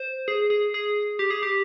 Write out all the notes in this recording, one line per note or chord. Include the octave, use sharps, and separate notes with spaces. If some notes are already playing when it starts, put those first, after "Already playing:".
Already playing: C5
G#4
G#4
G#4
G4
G#4
G4